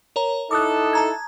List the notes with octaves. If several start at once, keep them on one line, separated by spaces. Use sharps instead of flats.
A#4 C#5 A#5
D#4 E4 A4 D6 D#6 F#6
A5 A#5 G#6